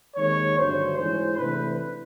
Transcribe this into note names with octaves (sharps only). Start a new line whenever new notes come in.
D#2 D#3 G#3 C4 C#5
G2 D3 F#3 A3 D4 C5
G#2 E3 G#3 C#4 C5
C3 E3 A3 D4 B4